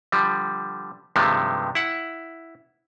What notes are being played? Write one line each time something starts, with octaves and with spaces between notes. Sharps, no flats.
D3 F3 G3
G2 C3 D#3 F3 G#3 A3
E4 F#5